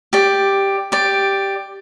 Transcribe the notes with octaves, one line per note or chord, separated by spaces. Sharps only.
G4 D5
G4 D5